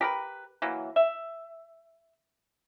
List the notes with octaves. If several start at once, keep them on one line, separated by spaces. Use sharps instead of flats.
G4 A#4 B4
E3 F#3 A#3
E5